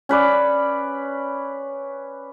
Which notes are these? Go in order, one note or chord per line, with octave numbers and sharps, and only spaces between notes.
C#4 B4 D5